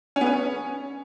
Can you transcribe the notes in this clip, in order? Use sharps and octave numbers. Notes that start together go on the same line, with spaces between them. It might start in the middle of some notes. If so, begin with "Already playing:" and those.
C#4
B3
C#4